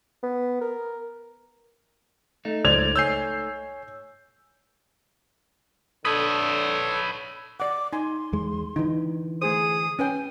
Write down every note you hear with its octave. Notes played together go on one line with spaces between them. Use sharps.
B3
A#4
A3 D#4
C#2 C5 D5 G#6 F7
C#5 G#5 E6 G6 C7
D3 A4 B4 C#5 D#6
D5 F#5 D6
D#4 G#5 C6
E2 G#3
D3 E3 D#4
A3 G#4 C5 D#6
C#4 B4 G5 G#5